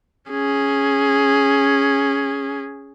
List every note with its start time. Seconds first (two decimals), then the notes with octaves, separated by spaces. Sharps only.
0.30 C#4 G#4